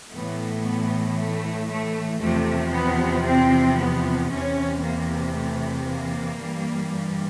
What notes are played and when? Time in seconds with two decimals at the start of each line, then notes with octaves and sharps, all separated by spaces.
0.12 A2 E3 A3 B3
0.65 B3
1.17 A3
1.69 A3
2.20 E2 C3 F3 A3
2.73 B3
3.25 C4
3.77 B3
4.30 E2 C3 E3 C#4
4.82 A#3
5.34 A3
5.86 A#3
6.38 G2 E3 G3